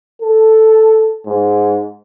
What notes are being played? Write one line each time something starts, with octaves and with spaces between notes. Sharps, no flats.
A4
G#2